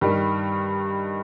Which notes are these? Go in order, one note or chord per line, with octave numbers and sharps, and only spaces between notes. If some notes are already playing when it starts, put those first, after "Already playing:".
G2 D#3 G3